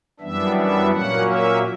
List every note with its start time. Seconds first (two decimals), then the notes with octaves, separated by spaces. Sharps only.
0.20 F#2 E3 G3 B3 D4 E5
0.56 E5
0.91 A#2 F#3 A#3 C#4 F#5
1.27 E5